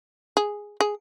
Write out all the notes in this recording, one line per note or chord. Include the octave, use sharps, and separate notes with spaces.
G#4
G#4